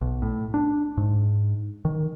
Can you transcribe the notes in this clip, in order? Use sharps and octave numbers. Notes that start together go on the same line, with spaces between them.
B1
A2
D4
G#2
D#3